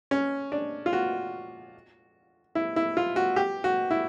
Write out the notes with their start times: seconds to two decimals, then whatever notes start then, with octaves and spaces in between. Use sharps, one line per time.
0.11 C#4
0.52 D4
0.86 F4
0.93 F#4
2.55 E4
2.76 E4
2.97 F4
3.16 F#4
3.36 G4
3.64 F#4
3.91 E4